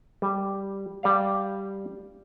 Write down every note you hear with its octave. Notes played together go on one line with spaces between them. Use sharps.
G3
G3 D5 F5